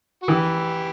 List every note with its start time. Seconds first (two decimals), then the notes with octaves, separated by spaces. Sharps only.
0.22 F#4
0.28 E3 E4 G4